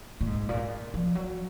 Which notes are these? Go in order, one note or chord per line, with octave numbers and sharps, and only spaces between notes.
A#2
G#2
A#2
F3
F#3